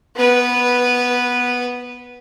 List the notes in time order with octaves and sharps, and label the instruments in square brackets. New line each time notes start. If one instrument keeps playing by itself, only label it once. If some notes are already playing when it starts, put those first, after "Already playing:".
[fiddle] B3 B4